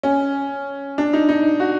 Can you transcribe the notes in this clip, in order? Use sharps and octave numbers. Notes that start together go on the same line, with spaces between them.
C#4
D4
D#4
D#4
F#4